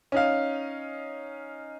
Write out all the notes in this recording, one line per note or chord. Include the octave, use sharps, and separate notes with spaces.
C#4 D#4 F5